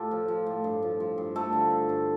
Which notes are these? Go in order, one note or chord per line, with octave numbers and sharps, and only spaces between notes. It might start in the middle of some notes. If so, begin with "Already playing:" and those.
Already playing: A2 F4 G4 A4
F3
F3
A2
G2
F3
F3
G2
F3 A3 A4
D3
G2
G2